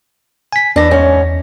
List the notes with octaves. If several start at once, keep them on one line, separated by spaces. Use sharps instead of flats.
G#5 B6
E2 E3 D4 A#6
G#2 C#4